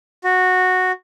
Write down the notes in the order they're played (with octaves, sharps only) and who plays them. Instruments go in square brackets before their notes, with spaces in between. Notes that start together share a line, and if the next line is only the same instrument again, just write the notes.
[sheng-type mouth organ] F#4